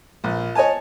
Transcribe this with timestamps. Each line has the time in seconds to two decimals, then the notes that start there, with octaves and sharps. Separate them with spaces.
0.24 A#1
0.55 C#5 D#5 G#5 A5